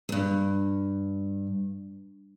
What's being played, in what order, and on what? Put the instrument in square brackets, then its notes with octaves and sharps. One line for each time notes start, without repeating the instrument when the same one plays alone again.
[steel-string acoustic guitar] E2 G2